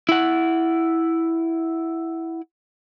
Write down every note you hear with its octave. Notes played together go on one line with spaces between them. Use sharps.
E4 F#5